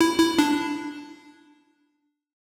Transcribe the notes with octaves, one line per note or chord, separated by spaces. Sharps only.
E4
E4
D4